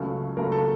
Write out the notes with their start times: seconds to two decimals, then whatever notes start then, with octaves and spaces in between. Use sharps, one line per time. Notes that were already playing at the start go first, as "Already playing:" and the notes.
Already playing: C#2 C#3 F#3 A3
0.37 C#2 C#3 F#3 A3 A#4
0.52 A4